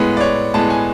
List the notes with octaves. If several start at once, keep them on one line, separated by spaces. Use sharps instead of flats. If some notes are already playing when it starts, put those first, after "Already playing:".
Already playing: A2 G#3 B3
D5
C#5
A2 G#3 B3 A5
G#5